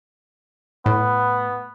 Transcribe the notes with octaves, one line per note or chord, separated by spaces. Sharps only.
A2 B3